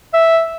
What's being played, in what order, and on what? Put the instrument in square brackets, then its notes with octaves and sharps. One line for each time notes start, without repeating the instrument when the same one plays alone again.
[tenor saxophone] E5